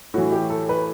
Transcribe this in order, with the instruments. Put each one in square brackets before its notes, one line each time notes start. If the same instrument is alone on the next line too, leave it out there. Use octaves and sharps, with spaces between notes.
[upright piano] A2 E3 F#4
G4
A4
B4